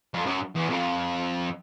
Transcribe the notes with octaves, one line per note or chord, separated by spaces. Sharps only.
F2
F#2
E2
F2